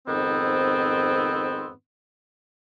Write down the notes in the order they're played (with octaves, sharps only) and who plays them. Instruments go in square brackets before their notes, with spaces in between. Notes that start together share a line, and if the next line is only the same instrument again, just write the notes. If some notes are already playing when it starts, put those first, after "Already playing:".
[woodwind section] F2 G#2 D#3 B3 C4